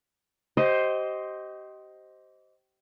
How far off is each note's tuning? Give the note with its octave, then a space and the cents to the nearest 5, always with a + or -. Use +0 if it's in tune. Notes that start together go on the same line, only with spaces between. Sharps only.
G4 -30 C5 +5 D#5 +10